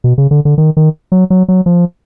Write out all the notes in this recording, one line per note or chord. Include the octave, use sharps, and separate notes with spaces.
B2
C#3
D3
D3
D#3
D#3
F#3
F#3
F#3
F3